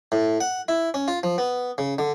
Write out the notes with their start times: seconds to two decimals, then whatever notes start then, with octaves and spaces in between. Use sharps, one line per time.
0.12 A2
0.41 F#5
0.68 E4
0.94 C#4
1.08 F4
1.23 F3
1.38 B3
1.78 C#3
1.99 D3